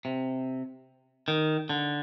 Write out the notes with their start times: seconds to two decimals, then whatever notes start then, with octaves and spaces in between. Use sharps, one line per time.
0.05 C3
1.28 D#3
1.69 D3